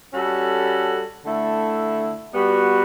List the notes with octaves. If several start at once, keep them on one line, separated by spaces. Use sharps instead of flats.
G3 C#4 F#4 A4
D3 A3 E4 A4
G3 B3 F#4